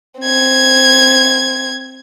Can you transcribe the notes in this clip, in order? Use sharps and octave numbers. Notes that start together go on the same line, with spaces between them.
C4 G#6